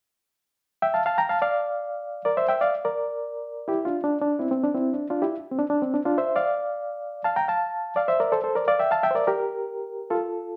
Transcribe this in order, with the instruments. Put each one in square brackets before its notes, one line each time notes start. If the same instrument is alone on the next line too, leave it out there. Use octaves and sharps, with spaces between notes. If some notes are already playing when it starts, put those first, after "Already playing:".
[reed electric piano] E5 G5
F5 A5
F5 A5
G5 A#5
F5 A5
D5 F5
A#4 D5
C5 E5
E5 G5
D5 F5
A#4 D5
E4 G4
D4 F4
D4
D4
C4 E4
C4
D4
C4 E4
D4
D4 F4
E4 G4
C4
D4
D4
C4
D4
D4 F4
C5 E5
D5 F5
F5 A5
G5 A#5
F5 A5
D5 F5
C5 E5
A#4 D5
A4 C5
A4 C5
A#4 D5
D5 F5
E5 G5
F5 A5
E5 G5
C5
A#4 D5
G4 A#4
F4 A4